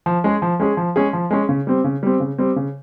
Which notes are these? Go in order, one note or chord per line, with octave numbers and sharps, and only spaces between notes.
F3
G#3 C#4 G#4
F3
G#3 C#4 G#4
F3
G#3 C#4 G#4
F3
G#3 C#4 G#4
C#3
G3 C4
C#3
G3 C4
C#3
G3 C4
C#3